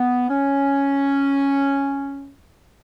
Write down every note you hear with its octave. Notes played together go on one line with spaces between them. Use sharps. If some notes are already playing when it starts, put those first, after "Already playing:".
Already playing: B3
C#4